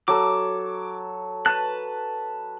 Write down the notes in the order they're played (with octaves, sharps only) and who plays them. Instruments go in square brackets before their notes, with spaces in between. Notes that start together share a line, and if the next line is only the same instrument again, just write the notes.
[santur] F#3 A4 [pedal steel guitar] D6
[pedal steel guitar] B4 F#6 [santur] A5